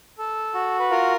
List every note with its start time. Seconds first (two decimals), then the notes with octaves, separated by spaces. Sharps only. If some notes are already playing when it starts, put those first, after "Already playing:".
0.18 A4
0.54 F#4
0.80 B4
0.91 F4 A#4